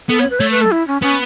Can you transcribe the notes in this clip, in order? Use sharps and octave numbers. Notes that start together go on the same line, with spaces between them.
B3 A4
C#5
B4
A3 C#5
B4
A4
E4
C#4
B3 C#4